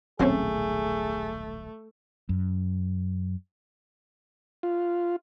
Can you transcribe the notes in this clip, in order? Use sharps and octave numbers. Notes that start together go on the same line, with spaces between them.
D#1 B1 A2 F#3 A3 C4 C#4 G#4
F#2
F4